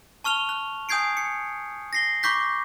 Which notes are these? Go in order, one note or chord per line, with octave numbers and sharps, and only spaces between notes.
A5 C#6 F6 F7 G7
F#6
G#5 D#6 G6 G#6 C7 D7
C#7
A#6 C7 G7
B5 C#6 D6 G6 B6